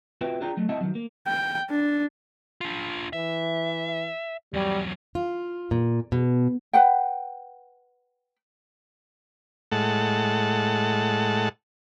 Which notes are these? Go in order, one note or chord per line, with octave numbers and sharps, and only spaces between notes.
C4 F4 F#4 B4 E5 G5
D4 F4 G#4 D5 G5 A#5
F#3 A3
C4 E4 D#5 E5 F#5 A5
D#3 F#3
A#3
G5
D4
D4 F4
E3 E5
E2 F#3 G3
F4
A#2
B2
B4 F#5 G5
A2 G#3 F#5 A5